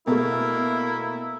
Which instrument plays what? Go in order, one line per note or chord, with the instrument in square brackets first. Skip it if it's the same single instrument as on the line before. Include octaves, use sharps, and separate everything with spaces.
[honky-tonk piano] B2 A3 [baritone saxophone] A#3 [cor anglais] E4